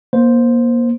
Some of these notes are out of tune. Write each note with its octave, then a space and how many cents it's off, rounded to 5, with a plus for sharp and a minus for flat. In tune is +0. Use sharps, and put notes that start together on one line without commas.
A#3 +30 C5 +0